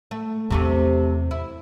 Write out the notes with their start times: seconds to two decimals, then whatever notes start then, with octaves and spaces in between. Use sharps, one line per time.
0.11 A3
0.50 E2 C3 A3 C4
1.31 E4